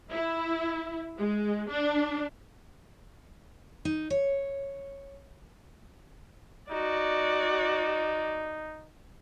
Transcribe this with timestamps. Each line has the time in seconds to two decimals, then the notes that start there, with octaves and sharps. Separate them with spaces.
0.11 E4
1.17 G#3
1.70 D4
3.85 D#4
4.10 C#5
6.71 D#4 F#4 D5